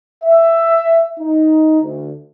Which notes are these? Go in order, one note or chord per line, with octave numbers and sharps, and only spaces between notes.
E5
D#4
D2